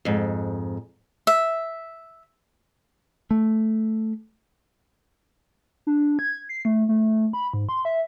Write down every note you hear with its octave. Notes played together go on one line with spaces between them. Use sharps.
F2 G#2
E5
A3
D4
G#6
C7
A3
A3
B5
G#2
C6
E5